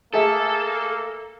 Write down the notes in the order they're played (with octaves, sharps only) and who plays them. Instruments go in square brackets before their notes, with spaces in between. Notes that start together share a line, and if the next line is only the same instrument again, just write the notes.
[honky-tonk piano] A3 G#4 E5 [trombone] A#3 [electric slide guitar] A4